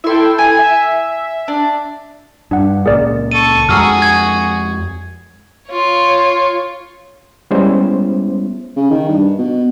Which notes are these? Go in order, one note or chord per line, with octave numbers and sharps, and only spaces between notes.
E4 A4 E5 G5 C6
G#5
E5
D4
G2 D4 F#5
C#2 A#2 G#4 A#4 D5
A4 C#6 D#7
F2 F3 G#3 F#4 G#4 A#5 E6 F6
G#6
F4 C#5
G3 G#3 B3 C#4 E4 C5
C#3
D#3
G2
B2